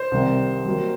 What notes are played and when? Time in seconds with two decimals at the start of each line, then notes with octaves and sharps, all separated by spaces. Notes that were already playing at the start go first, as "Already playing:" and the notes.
Already playing: C5
0.12 C2 C3 D#3
0.65 D#3 F#3 A#3